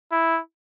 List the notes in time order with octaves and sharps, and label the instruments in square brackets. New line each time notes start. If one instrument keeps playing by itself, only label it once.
[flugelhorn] E4